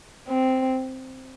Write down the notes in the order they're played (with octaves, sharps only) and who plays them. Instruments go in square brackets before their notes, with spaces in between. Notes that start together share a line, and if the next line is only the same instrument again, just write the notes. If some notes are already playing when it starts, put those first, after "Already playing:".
[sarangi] C4